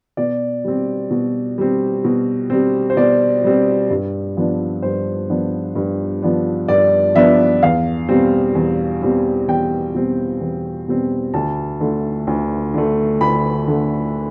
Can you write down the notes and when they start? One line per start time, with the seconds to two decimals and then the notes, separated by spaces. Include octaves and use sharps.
0.17 B2 D5
0.64 G3 C4
1.11 B2
1.58 G3 C4
2.04 B2
2.50 G3 C4
2.90 C5
2.97 B2 D5
3.44 G3 C4
3.90 G2
4.37 F3 B3 D4
4.82 G2 C5
5.30 F3 B3 D4
5.75 G2
6.22 F3 B3 D4
6.68 G2 D5
7.15 F3 B3 D4 E5
7.62 E2 F5
8.09 B2 G3 C4
8.55 E2
9.02 B2 G3 C4
9.48 E2 G5
9.94 B2 G3 C4
10.41 E2
10.88 B2 G3 C4
11.34 D2 A5
11.81 D3 A3
12.27 D2
12.74 D3 A3
13.21 D2 B5
13.67 D3 A3